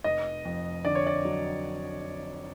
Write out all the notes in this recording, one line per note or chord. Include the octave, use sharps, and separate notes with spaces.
F1 D#5
F2
D3 D5
C#5
D5
F#3